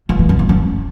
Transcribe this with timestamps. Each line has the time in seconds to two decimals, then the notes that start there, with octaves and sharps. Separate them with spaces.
0.09 F3
0.19 E3
0.29 F#2
0.39 E2
0.49 F#2